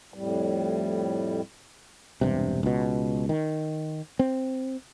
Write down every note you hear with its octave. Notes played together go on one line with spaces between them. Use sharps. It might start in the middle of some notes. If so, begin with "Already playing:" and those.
F2 A2 G3
E1 G2 C3
C#2 B2
D#3
C4